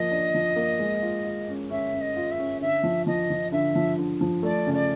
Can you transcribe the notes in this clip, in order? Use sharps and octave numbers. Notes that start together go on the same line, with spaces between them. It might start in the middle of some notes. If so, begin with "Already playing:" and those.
Already playing: F3 A#3 D#5
D4
F3
A#3
G#3
F4
F4
C#4
C#4 E5
C#4
D#5
F4
E5
C#4
D3 E5
F3
F3 D#5
F3
D3 E5
F3
D3
F3
A3 D5
C#3
D5